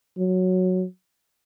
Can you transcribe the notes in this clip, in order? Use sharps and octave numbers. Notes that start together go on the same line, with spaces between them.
F#3